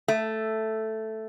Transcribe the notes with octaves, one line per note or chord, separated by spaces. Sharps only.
A3